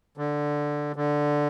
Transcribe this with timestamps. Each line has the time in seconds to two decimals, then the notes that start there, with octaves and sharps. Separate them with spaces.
0.18 D3
0.96 D3